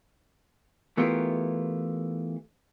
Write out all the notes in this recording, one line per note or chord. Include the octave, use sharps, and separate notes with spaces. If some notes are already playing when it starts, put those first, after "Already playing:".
E3 A3 B3 F4 G4 A#4